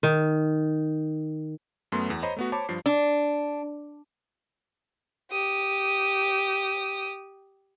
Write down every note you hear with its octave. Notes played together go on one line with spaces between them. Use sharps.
D#3
F#2 A3 B3 C6
E2
C5 C#5 D#5 A#5 B5
A3 B3 F#4
C5 C#5 A5 B5 D6
G2 F3 C7
D4
G4 D#6